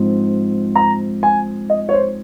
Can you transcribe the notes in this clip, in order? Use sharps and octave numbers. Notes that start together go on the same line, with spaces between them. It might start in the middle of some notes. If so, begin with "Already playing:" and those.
Already playing: G#2 F3 C4
A#5
G#5
D#5
C#5
C5